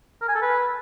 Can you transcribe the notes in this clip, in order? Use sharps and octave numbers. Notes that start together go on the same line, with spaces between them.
A#4
G#5
A4
B4